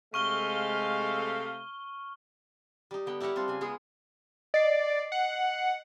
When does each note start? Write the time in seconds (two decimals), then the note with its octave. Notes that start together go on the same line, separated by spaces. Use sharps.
0.14 C3 G#3 A3 F5 C#6 F6 G7
2.91 G3 D#4
3.06 D3 B3 G5
3.20 E4 G4 A#4 C#5 F#5
3.35 G3 C4 D4 F4
3.48 C#3 G#5
3.61 G#3 B3 G#4
4.54 D5 D#5 C7
5.12 F#5